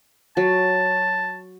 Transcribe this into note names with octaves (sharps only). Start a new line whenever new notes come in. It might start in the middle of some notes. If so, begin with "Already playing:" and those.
F#3 A5